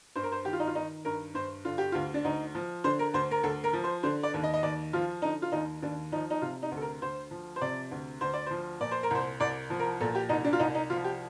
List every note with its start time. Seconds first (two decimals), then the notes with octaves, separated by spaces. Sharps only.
0.16 G2 C5
0.23 A#4
0.32 C5
0.45 D#3 G4
0.53 F4
0.60 D#4
0.67 F4
0.75 D#3 D#4
1.05 G2 A#4
1.34 G2 C5
1.65 D3 F4
1.78 G4
1.92 D2 F4
2.14 D4
2.24 D2 D#4
2.55 F3
2.84 D3 C5
2.99 A#4
3.14 D2 C5
3.31 A#4
3.43 D2 A4
3.64 A#4
3.73 F3
3.84 C5
4.03 D3 C5
4.23 D5
4.34 D#2
4.43 D#5
4.54 D#5
4.63 D#2 D5
4.93 F3 F4
5.22 D3 D#4
5.42 F4
5.52 D#2 D#4
5.82 D#2 D4
6.12 F3 D#4
6.30 D#4
6.42 C3 F4
6.62 D#4
6.71 D2
6.77 A4
6.81 A#4
7.02 D2 C5
7.31 F3
7.56 C5
7.61 C3 D5
7.91 D2
8.21 D2 C5
8.33 D5
8.46 F3 C5
8.80 A#2 D5
8.91 C5
9.03 A#4
9.11 C2 C5
9.40 C2 D5
9.70 F3
9.80 A#4
10.01 A#2 A4
10.15 G4
10.29 C2 D#4
10.44 D4
10.53 F4
10.59 C2 D#4
10.75 D#4
10.90 F3 F4
11.04 G4